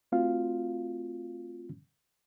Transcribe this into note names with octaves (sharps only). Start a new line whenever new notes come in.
A3 C4 F4 F#4 F5